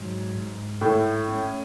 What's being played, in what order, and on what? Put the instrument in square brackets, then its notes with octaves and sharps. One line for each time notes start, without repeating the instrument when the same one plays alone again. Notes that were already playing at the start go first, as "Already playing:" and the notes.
Already playing: [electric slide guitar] G#2 F#3
G#2
[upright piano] A2 [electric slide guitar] A3
[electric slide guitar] C#4